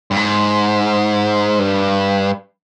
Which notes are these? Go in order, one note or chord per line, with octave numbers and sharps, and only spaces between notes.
G2
G#2
G2